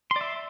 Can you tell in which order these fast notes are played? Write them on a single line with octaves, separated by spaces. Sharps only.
C6 D5 E5